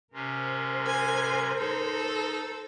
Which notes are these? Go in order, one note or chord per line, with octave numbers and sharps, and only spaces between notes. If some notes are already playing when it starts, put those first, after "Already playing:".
C3 C#4 A#4 C5
G#5
D#4 A4